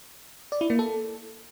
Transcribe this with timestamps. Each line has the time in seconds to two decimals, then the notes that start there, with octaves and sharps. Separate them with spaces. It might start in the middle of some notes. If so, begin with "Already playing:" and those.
0.52 D5
0.61 E4
0.70 A#3
0.79 A4